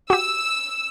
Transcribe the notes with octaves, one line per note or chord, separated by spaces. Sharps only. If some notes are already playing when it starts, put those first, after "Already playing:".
F#4 G4 E6